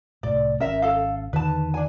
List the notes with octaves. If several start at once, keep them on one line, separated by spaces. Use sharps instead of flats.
C2 A2 D5
G#1 C#4 A#4 E5
A4 F5
E2 D3 D#3 B4 A5
D4 G#5